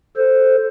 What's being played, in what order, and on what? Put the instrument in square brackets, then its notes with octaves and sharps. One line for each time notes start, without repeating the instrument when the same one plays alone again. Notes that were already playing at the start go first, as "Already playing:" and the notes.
[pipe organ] A4 C5